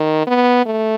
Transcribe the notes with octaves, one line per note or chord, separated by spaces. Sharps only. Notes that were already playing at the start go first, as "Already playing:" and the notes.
Already playing: D#3
B3
A3